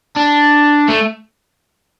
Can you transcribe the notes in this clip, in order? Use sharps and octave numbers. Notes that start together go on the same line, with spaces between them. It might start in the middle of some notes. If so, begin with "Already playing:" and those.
D4
A3